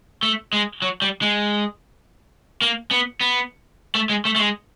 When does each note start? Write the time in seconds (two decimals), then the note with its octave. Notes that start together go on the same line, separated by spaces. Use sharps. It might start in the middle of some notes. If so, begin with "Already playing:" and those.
0.23 A3
0.53 G#3
0.82 F#3
1.02 G3
1.22 G#3
2.62 A#3
2.91 B3
3.21 B3
3.95 A3
4.09 G#3
4.25 A3
4.36 A3
4.39 G#3